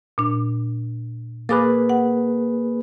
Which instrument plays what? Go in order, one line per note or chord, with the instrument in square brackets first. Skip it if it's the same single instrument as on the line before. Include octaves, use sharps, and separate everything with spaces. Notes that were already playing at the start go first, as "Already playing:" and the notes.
[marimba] A#2 D4
[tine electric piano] A#3 G#4 B4 [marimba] B5 D6 A6
[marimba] F#5